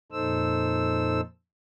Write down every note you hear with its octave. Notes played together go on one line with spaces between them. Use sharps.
F2 A#2 D#4 A4 C5 E6